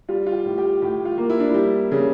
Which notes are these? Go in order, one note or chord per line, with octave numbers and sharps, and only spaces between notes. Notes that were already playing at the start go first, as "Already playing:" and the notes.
G3 F4
F4
G4
A2
G4
A2 G4
F4
A#3
E4
D4
G3 E4
C#3